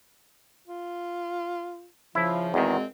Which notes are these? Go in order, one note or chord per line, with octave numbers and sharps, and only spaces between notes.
F4
C#3 F3 E4 F4
E2 A#2 D#3 G#3 C4 F#4